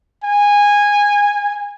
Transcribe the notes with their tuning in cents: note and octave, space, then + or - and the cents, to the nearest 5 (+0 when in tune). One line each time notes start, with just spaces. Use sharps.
G#5 -15